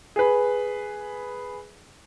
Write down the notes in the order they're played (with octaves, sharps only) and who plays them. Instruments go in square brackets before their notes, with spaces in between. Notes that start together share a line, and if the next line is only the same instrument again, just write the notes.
[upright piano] G#4 B4